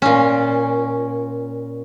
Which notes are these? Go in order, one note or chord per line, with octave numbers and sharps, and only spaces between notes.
A#2 C#4